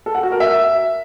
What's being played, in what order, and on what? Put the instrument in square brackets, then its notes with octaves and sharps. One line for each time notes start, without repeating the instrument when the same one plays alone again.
[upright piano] A4
F#5
F#4
A#4
E5